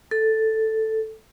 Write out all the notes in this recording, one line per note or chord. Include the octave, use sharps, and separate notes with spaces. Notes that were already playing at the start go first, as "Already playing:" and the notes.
A4